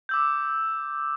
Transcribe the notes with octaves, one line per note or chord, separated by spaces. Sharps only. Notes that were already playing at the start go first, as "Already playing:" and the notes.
D6 E6 G6